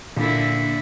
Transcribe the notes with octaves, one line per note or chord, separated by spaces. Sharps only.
A#2 D3 E4